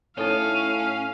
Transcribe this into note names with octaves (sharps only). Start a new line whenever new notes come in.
A2 C#4 D#4 A4 C#5 F5